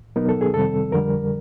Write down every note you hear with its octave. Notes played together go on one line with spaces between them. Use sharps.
B2 F#3 B3 D#4 A#4
A4
G#4
F2 C3 D#3 G3 C4 A4
F2 D3 G3 A#4